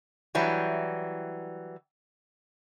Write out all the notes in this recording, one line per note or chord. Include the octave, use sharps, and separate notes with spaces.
E3 F#3 G3